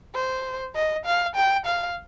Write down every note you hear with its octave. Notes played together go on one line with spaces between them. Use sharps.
C5
D#5
F5
G5
F5